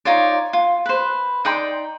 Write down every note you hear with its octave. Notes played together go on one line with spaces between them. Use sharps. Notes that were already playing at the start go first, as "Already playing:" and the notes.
D#4 F4 C#5 D5
F4
B4 C5
D#4 D5 G5 C6